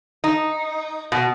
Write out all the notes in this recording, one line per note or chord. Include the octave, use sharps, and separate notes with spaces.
D#4
B2